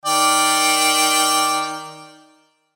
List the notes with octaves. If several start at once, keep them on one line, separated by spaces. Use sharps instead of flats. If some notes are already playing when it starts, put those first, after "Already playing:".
D#3 D5 G5